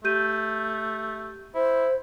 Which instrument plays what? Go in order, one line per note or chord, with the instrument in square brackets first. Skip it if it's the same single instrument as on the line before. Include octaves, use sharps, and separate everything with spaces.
[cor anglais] A3 [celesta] G4 G6 D#7
[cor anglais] E4 [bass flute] C5